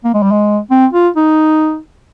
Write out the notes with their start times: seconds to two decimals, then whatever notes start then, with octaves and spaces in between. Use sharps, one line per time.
0.04 A#3
0.14 G#3
0.23 G3
0.32 G#3
0.71 C4
0.93 F4
1.16 D#4